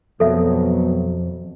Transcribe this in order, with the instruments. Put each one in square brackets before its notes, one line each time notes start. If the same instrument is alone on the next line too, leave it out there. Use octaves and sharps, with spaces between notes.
[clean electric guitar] F2 [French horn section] B2 F#3 [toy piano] A4 E5